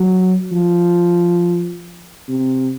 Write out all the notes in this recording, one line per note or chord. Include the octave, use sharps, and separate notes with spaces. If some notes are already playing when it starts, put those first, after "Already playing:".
Already playing: F#3
F3
C3